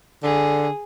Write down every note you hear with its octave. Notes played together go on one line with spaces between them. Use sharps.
D3 G#4